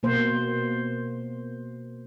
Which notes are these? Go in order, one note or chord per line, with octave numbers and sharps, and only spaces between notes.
B2 A#3 C5